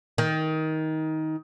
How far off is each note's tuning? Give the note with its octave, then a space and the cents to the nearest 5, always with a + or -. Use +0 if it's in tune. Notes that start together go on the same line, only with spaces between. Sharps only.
D#3 +20